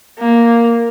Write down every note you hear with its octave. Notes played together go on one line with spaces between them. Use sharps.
A#3